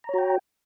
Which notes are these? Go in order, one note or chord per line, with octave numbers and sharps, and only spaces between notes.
F#4 C#5 G5 A#5